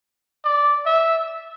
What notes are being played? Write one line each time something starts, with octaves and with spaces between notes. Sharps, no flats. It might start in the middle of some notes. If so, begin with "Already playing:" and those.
D5
E5